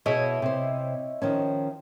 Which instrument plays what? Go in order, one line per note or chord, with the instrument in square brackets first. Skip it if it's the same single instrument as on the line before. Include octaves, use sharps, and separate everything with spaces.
[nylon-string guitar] B2 G#4 [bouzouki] E4 C#5 D#5
[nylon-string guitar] C3 C5
D#3 F3 C#4